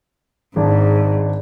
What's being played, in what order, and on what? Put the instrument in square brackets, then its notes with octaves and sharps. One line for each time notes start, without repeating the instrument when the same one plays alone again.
[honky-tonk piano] G#1 D4 [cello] G#2